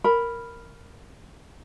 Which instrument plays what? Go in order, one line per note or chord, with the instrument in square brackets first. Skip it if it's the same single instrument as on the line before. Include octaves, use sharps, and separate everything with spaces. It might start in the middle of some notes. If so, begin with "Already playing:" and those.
[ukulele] A#4 B5